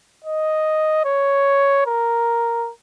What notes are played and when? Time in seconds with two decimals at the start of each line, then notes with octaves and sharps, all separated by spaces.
0.25 D#5
1.05 C#5
1.86 A#4